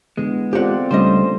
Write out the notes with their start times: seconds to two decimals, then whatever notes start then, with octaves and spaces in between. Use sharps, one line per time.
0.17 D3 E3 G#3 B3
0.53 C4 F4 G4 A4 D5 F#5
0.91 C#2 G3 A3 C#4 D4 C5 D#5